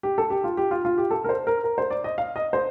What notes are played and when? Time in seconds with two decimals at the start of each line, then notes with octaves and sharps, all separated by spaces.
0.03 G4
0.18 A4
0.30 G4
0.44 F4
0.57 G4
0.71 F4
0.85 F4
0.98 G4
1.11 A4
1.24 A#4
1.29 C5
1.47 A#4
1.64 A#4
1.78 C5
1.90 D5
2.04 D#5
2.18 F5
2.36 D#5
2.53 C5